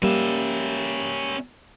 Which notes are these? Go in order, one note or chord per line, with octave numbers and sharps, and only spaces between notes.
G3 A#3 C#4 E5